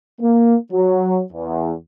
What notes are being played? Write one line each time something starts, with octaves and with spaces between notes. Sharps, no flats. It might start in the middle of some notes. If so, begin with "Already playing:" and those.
A#3
F#3
E2